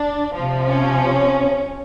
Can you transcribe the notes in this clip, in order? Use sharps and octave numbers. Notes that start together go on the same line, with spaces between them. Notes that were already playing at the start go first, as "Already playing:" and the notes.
Already playing: D4
C3 F3
C#4